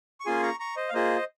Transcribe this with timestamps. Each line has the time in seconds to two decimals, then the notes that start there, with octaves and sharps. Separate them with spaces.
0.20 C#6
0.26 A#3 C#4 F4 G#4 G#5 C6
0.43 A#5 C#6
0.60 A#5 C#6
0.76 C5 D#5
0.89 F5
0.93 A#3 F4 G#4 C5 D#5